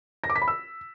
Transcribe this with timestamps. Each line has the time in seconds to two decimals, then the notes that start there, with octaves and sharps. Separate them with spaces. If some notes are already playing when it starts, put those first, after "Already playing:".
0.24 A#6
0.30 D6
0.36 B6
0.42 B5
0.48 E6